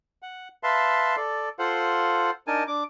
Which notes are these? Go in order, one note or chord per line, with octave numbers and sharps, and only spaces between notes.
F#5
B4 E5 F5 A5 C6
A4 D5
F4 A4 C5 F5 F#5
D4 D#4 A#4 G#5 A5
D4 D6